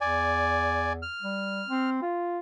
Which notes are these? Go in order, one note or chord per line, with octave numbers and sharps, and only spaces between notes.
E2 D5 G#5
F6
G3
C4
F4